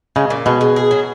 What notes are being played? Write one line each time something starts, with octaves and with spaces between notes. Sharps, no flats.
C#3 G#3
A#2
B2 G#3
G#3
G#4
F#3